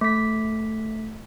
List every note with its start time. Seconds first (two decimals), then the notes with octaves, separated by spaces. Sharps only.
0.01 A3 B6